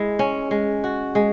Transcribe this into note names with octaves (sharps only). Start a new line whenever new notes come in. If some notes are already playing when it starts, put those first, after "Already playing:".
Already playing: G#3 E4
C#4
G#3
F#4
G#3